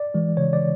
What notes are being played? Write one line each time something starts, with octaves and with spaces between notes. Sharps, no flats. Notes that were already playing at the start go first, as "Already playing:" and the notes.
Already playing: D5
E3 G#3
C#3 C#5
D5